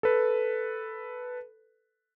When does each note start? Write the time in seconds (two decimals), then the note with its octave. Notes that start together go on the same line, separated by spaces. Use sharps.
0.03 A4 B4